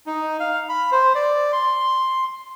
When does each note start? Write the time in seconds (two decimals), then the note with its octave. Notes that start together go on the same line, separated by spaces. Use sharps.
0.06 D#4
0.40 F5
0.69 B5
0.92 C5
1.15 D5
1.52 C6